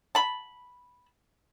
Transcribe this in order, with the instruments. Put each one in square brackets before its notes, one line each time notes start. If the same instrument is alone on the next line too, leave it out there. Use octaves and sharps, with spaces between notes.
[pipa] A5 B5